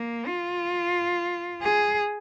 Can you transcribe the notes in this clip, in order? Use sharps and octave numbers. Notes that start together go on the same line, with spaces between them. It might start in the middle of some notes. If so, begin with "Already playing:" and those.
Already playing: A#3
F4
G#4